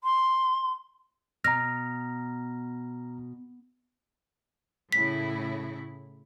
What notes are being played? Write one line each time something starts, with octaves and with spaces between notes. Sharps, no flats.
C6
B2 A#5 F6 A#6
A2 C#3 E4 B6